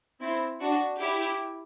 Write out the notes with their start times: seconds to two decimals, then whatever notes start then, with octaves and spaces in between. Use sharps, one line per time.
0.21 C4 E4
0.60 D4 F#4
1.00 E4 G4